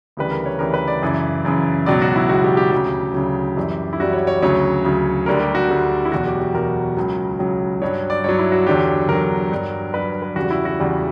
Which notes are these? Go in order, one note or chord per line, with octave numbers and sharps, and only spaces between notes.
D2 C#3 E3 G3 B4
A#4
C#5
D2 C#3 E3 G3 A#4
B4
D5
F#2 C#3 E3
F#2 C#3 E3
C#2 B2 F#3 D5
F#4
E4
C#2 B2 F#3 F#4
G4
G4
D2 C#3 F#3 G4
D2 C#3 F#3
F#2 E3 G3
E4
F#2 E3 G3 F#4
C#5
C#5
D2 C#3 F#3 C#5
D2 C#3 F#3
D2 D3 G3 A#4
G4
F#4
D2 D3 G3
E4
E2 B2 F#3 F#4
G4
G4
E2 B2 F#3 A#4
C#2 C#3 F#3
C#2 C#3 F#3
G2 F#3 C#5
D5
G2 F#3 C#5
E4
F#4
E2 D3 F#3 G4
E2 D3 F#3 A#4
G2 F#3
G2 F#3 B4
B4
E2 C#3 G3 F#4
E4
F#4
E2 C#3 G3